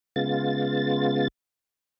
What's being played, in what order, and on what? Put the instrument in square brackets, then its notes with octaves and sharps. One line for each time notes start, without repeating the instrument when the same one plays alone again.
[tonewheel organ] C#3 G#3 B3 F4 A6